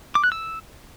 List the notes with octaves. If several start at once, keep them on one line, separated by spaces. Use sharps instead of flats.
D6
F#6
E6